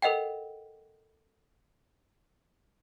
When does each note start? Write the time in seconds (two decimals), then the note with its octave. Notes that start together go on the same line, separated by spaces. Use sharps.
0.02 A4 A#4 D#5 F#5 G5